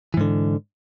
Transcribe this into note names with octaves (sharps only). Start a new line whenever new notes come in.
G#2 D3 E3